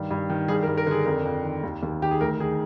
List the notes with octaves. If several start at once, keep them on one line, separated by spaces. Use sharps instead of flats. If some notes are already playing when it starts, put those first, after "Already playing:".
Already playing: G2 D#3
G2
D#3
G2 G#4
A#4
G2
A#4
D3 G#4
F2 A#4
F2
D#3
D#2
D#2
D#3 G4
G#4
D2 A#4
D#3 G#4